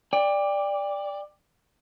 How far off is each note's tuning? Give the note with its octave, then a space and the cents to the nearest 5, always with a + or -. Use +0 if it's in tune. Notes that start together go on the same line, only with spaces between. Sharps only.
D5 +0 G5 +30